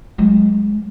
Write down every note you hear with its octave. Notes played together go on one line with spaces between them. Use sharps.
F#3 G#3